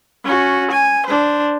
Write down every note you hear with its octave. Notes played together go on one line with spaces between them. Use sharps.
C#4 F#4
G#5
D4 C5